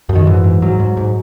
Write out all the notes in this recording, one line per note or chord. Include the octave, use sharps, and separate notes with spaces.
F#2
D#3
G#2 E3
G#2
G#2 F#3
G#2
G#2